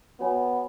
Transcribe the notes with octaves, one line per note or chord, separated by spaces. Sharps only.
B3 F#4 C#5 G#5